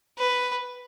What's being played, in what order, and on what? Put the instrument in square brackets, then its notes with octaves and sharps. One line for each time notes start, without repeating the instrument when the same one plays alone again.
[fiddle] B4